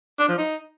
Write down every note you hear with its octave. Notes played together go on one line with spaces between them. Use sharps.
D4
F3
D#4